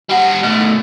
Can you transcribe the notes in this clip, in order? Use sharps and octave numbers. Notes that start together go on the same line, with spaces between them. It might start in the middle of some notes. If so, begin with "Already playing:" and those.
G3 F#5
B2 A3